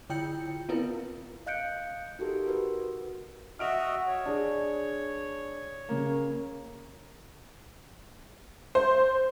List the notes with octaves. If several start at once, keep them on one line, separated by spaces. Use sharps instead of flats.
D3 E4 F4 G5 G6 C#7
B3 C4 E4 F4 A#4 B4
D#5 F5 F#6 G6 C#7 D7
D#4 F#4 G4 A4 A#4
F#4 A#4 B4
F#4 D#5 E5 F6 D7 F7
C#5
D4 G#4
C#3 A#3
C5